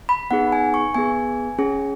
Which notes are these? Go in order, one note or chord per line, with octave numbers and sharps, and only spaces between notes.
B5
B3 D#4 G#4 F#5
G#5
C#6
B3 G#4 G#5
C#4 G#4